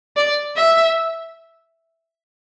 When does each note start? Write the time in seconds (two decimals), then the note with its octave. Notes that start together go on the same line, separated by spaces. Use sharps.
0.16 D5
0.56 E5